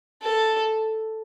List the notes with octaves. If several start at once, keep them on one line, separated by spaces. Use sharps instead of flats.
A4